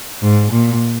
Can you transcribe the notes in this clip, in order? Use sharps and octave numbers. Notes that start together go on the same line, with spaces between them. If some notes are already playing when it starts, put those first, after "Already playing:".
G#2
A#2